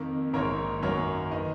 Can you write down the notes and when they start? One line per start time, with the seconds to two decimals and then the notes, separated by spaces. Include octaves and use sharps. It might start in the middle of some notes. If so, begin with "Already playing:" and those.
Already playing: F2 D#3 A#3
0.33 A#1 G#2 D#3 A#3 A#4 C#5
0.82 F#2 D#3 F#3 A#3 A#4 C#5
1.31 D#3 B4 D#5